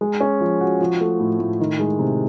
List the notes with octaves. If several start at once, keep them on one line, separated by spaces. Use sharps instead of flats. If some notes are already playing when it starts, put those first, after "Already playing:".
G#3
C#4
F3
F#4
F3
A3
A2
A2
D#3
G#3
C3